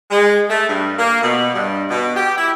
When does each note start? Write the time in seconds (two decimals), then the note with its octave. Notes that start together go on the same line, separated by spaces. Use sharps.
0.11 G#3
0.50 A3
0.69 G2
0.99 A#3
1.22 B2
1.54 G2
1.89 B2
2.16 G4
2.38 E4